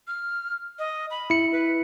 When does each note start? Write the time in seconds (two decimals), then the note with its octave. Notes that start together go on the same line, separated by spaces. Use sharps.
0.07 F6
0.79 D#5
1.11 B5
1.30 E4 C#7
1.52 B4